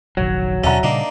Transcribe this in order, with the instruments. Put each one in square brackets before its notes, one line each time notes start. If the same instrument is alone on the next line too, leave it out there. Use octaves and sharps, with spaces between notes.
[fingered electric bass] F1 A#1 D#3 [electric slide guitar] F#3 [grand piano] C#5
[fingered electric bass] D#2 B2 [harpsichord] D3 C#4 A4 [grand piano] E5 F#5 A#5
[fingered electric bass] A#2 C#3 G3 [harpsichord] A#3 D4 D#4